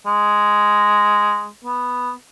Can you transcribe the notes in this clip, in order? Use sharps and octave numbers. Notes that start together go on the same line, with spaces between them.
G#3
B3